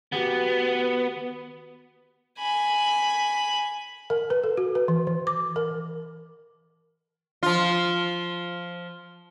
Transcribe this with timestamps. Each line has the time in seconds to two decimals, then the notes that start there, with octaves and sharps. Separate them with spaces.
0.12 D#3 B3 F#4 G4
2.39 G#5 B5
4.10 A#4
4.30 B4
4.44 A4
4.57 F#4
4.75 B4
4.88 E3
5.07 E3
5.27 D6
5.56 A#4
7.43 F3 F4